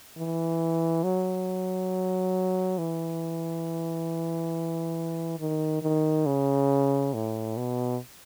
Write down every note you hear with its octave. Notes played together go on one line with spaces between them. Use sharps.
E3
F#3
E3
D#3
D#3
C#3
A2
B2